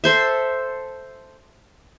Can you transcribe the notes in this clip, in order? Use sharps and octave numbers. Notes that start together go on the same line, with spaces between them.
A4 C5 E5